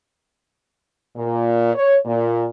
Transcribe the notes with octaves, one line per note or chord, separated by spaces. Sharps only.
A#2
C#5
A#2